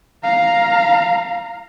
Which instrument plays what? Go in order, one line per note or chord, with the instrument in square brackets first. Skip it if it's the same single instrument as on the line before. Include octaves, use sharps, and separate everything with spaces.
[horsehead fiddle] F5 A#5